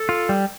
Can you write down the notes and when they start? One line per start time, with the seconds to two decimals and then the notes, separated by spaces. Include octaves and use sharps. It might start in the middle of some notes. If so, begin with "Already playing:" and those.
Already playing: A4
0.09 F4
0.29 G3